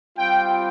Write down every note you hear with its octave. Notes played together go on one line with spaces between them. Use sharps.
G3 C4 F4 G5